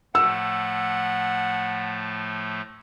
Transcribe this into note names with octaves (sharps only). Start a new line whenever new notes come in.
A2 F3 A3 F#5 E6